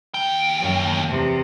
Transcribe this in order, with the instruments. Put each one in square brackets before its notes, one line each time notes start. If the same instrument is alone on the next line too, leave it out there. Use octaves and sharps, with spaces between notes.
[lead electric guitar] D#2 G5
[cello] F#2
E2 C3